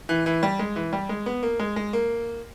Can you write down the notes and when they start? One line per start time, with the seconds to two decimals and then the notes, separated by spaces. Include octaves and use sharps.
0.09 E3
0.26 E3
0.43 G3
0.59 G#3
0.76 E3
0.93 G3
1.09 G#3
1.26 B3
1.43 A#3
1.59 G#3
1.76 G#3
1.93 A#3